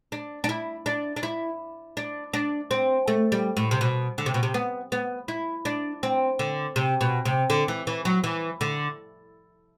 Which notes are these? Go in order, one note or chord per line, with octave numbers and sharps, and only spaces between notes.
D4
D4
E4
D4
D4
E4
D4
D4
C4
A3
G3
A2
C3
B2
D3
C3
B2
C3
B3
B3
E4
D4
C4
D3
C3
B2
C3
D3
E3
E3
F#3
E3
D3